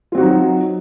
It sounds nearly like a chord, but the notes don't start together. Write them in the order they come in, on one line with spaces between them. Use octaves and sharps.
F4 C4 F#4 D#4 F#3